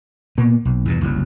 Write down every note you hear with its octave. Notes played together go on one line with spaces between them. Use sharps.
A#2 A#3 B3
B1
E2 G2 B2
F#1 C2 A#2 F#3